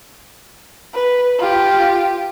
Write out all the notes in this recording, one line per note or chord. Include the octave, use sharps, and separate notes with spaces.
B4
F4 G4